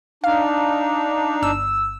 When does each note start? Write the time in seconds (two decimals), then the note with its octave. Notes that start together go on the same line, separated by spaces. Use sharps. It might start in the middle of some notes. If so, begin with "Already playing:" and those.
0.24 D4 D#4 F5
1.42 G1 E6